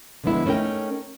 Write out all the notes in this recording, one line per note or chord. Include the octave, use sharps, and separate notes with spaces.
D3 F3 G#3 B3 E4
A3 C#4 D#4 A#4 G5